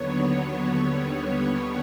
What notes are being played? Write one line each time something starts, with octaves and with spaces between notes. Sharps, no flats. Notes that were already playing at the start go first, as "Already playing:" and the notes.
Already playing: D#2 D3 F#3 B3 C#5
D#2 D3 G3 B3